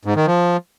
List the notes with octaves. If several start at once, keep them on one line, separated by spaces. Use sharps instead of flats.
G#2
D#3
F3